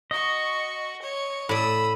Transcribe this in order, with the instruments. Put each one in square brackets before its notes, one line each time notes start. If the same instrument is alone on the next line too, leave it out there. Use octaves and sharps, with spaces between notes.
[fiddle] F#4 C#6 [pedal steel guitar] D#5
[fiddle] C#5
[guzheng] A2 D5 [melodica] B5 [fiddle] D#6 E6